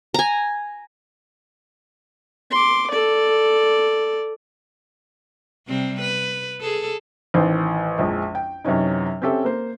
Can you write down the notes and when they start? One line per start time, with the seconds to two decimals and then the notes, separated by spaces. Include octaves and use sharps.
0.14 G#5 A#5
2.51 C6 D6
2.91 A4 D5
5.67 C3 G3 C4
6.01 B4
6.61 G#4 A4
7.34 A1 D#3 C5
7.99 A#1 F2 G#3
8.35 G5
8.64 F#2 C3 E3 C#4 D#4
9.22 C4 C#4 G4 A4 E5
9.44 A#3 C5